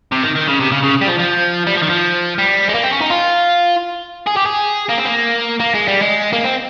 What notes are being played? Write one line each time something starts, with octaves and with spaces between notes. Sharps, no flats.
C3
D#3
D#3
C#3
C3
C#3
C#3
G3
F3
F3
G3
F3
D#3
F3
G3
G#3
A#3
C4
C#4
D#4
F4
G#4
G4
G#4
A#3
C4
A#3
A#3
G#3
G3
G#3
A#3
C4